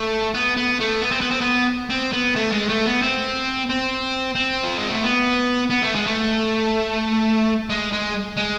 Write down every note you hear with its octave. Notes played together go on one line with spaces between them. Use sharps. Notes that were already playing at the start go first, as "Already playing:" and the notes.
Already playing: A3
B3
B3
A3
B3
C4
B3
C4
B3
C4
B3
A3
G#3
A3
B3
C4
C4
C4
F3
G#3
A3
B3
B3
A3
G#3
A3
G#3
G#3
G#3